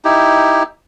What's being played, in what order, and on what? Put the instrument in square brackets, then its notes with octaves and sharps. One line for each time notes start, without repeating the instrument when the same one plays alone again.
[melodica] D#4 E4 G4